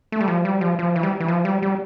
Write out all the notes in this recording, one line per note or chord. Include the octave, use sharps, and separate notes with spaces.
A3
G3
F3
G3
F3
F3
E3
G3
E3
F3
G3
G3